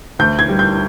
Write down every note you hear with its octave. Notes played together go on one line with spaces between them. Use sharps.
D2 G6
G#6
G3
G6